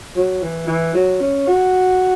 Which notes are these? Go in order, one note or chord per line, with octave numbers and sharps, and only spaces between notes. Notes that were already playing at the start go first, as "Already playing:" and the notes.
F#3
E3
E3
F#3
C#4
F#4